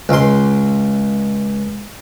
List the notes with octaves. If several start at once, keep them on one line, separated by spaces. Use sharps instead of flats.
C#2 C6